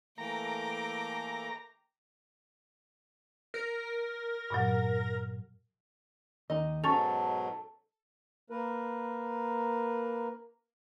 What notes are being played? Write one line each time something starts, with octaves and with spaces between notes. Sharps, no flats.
E3 A3 A#3 G5 A#5 D6
A#4
G2 A#2 F#3
D#2 D#4 D#5
G#2 B2 F#3 C#4 A4 C#6 A6 F7
A#3 A#4 B4